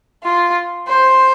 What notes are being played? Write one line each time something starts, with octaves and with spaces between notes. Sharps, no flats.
F4
C5